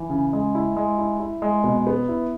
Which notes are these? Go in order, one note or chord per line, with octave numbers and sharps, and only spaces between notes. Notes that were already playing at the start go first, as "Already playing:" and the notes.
Already playing: E3
C#3
G#3
E4
G#3
E4
E4
G#3
B2
B3
E4